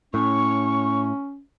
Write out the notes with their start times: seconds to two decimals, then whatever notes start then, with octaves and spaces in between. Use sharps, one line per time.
0.14 A2 C#4 C#6